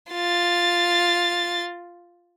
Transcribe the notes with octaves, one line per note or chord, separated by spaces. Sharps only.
F4 A6